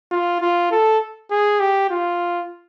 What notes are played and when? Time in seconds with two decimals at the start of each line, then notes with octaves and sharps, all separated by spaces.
0.11 F4
0.41 F4
0.71 A4
1.31 G#4
1.60 G4
1.90 F4